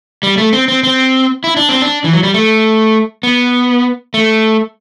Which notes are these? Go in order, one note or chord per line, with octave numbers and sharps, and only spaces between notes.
G3
A3
C4
C4
C4
E4
D4
C4
D4
E3
F#3
G3
A3
B3
A3